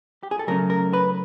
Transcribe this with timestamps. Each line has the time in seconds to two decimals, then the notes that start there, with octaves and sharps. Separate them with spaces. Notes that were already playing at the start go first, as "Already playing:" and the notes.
0.23 G4
0.31 G#4
0.39 A4
0.47 C#3 F#3 A3 C#4 A#4
0.70 A#4
0.93 B4